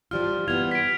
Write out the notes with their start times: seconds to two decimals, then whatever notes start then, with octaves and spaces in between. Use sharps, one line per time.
0.11 F3 G3 F4 F6
0.48 E3 G3 B3 G#6 F7
0.71 B6 D7